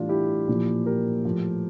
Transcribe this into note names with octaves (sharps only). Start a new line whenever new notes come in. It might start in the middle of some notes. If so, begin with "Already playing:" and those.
Already playing: A2 E3 G3 D4 F4
E4 G4
A#2 F3
G4 A#4
A2 F3